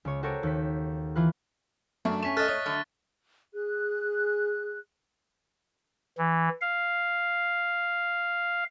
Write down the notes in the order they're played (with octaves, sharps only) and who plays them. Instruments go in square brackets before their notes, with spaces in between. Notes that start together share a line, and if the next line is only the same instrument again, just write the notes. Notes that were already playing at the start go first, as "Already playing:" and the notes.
[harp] C#2 C#5
F#4 G4 A4 A#4 C5 C#5
D#2 B6
E3 F4 B4 F#6
[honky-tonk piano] F#2 A3 C#6 [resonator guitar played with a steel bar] D4
[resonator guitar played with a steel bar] A3 [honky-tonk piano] C#4 E7 [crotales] C#6 B6
[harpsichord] A4 D#5 [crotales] F6 F#6 A6
[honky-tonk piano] C#5 [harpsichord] D#5
[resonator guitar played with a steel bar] D3 F#3 A3 [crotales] F6
[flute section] G#4 F#6
[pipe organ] E3
F5